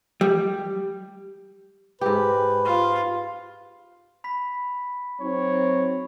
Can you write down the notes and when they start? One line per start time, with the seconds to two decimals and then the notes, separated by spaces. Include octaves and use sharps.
0.21 G3
2.01 G#2 G4 B4
2.65 F4
4.24 B5 B6
5.20 F#3 C4 D#4 C#5